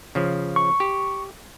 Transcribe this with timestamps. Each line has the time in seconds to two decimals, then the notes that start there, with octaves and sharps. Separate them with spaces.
0.15 C#3 F3
0.56 C#6
0.80 G4